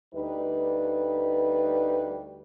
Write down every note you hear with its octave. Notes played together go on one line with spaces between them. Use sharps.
D2 G3 D#4 B4